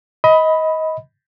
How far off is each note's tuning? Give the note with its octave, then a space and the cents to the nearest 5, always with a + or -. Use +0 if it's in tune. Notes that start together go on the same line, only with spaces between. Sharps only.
D#5 +25 B5 +0